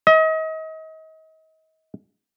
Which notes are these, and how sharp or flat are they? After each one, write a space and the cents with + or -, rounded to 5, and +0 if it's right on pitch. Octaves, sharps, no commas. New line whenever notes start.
D#5 +35